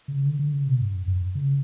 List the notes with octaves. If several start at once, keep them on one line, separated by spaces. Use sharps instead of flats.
C#3
D3
D3
C#3
B2
G2
F#2
F#2
C#3